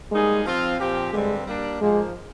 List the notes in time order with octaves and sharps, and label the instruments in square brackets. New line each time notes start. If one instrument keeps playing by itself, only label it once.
[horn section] G3 A#3 D#4 G#4 [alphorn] G#3
[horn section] F3 C4 F4
A#2 F3 C4 G4
[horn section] G2 D3 G3 C4 [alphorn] G#3
[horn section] G3 A#3 D4
[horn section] G#2 F3 A#3 [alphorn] G#3